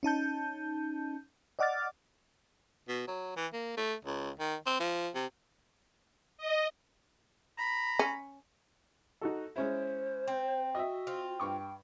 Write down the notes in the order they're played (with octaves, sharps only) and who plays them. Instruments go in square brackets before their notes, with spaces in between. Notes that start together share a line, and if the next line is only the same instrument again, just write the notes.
[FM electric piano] C#4 D#4 A5 G6
D5 D#5 F#5 D6 F6 A6
[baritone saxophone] B2
F#3
E3
A#3
A3
C#2
D#3
C4
F3
C3
[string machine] D#5
[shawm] A#5 [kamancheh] B5
[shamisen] C#4
[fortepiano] D#4 F#4 A4
[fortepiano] G#3 C#4 E4 [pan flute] C5
[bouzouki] C4
[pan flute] F#4 [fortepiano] D#5 E5
[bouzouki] C4 F4
[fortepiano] G2 C#6 D6 [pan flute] G5